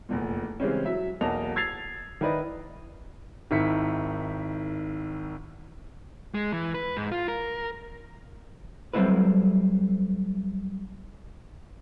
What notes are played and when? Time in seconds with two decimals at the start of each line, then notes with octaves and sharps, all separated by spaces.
0.09 F1 E2 A#2
0.60 C#3 E3 G3 G#3 C4 C#4
0.86 F#3 E5
1.21 B1 E2 A#3 D#5 A5 F7
1.56 E6 G#6 A6 C7 F7
2.21 D#3 E4 B4 D5 D#5
3.51 G#1 D#3 E4 B6 C#7
6.34 G#3
6.52 E3
6.74 B4
6.97 G#2
7.12 F4
7.28 A#4
8.93 F#3 G3 A3 C4 E4 B4